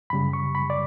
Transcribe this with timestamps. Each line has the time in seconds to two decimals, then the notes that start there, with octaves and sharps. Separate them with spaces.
0.10 F#2 C#3 G3 B5
0.33 C#6
0.55 B5
0.70 D5